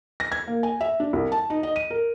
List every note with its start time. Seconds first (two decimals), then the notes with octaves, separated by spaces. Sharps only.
0.20 A#6
0.32 G#6
0.48 A#3
0.63 G#5
0.81 E5
1.00 D4
1.13 C2
1.32 A5
1.50 D#4
1.63 D#5
1.76 D#7
1.90 A#4